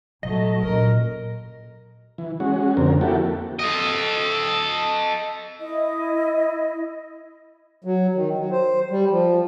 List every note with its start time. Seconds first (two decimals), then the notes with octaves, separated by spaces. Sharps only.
0.23 A#2 F#3 A3 D#5
0.62 A#2 F#3 C#4 A#4
2.18 E3
2.40 G#3 C#4 F#4
2.77 F2 D3 C4 A#4
3.01 A#3 E4 F#4 G4 A4
3.59 A4 D#5
5.60 E4 D#5
7.84 F#3
8.15 D#3
8.37 F#3
8.51 C5
8.90 G3
9.10 F3